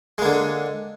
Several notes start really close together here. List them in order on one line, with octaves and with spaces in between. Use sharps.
G#3 A#3 D3